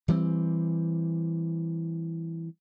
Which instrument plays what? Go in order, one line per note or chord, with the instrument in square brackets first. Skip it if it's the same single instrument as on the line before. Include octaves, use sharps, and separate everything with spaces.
[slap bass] E3 G3 A3 C4